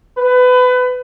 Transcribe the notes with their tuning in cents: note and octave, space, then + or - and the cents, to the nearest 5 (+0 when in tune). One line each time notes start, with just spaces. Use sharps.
B4 +25